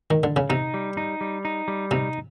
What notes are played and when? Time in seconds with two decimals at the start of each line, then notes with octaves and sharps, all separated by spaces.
0.11 D#3
0.23 D3
0.36 C#3
0.50 C3 D#4
0.74 G3
0.97 D#4
1.21 G3
1.45 D#4
1.68 G3
1.91 C3 D#4